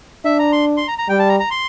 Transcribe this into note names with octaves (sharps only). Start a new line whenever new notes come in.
D4 E5
A#5
C6
C6
A#5
A#5
G3 G5
A5
A#5
A#5
C6